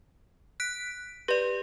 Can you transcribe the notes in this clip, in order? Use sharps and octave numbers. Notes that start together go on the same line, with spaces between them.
F#6 B6 D7
G4 B4 D5